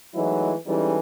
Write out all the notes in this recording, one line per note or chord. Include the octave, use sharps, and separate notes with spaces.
E3 F#3 G#3 A3 D#4 E4
E3 G3 G#3 C#4 D#4 A4